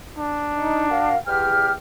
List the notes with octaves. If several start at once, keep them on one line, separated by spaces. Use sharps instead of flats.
D4
D#4
F#4 A#4 F5
E2 G4 G5 F6